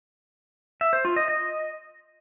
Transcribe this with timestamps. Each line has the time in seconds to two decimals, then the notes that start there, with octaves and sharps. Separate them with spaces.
0.81 E5
0.93 C5
1.05 F4
1.16 D#5
1.28 D#5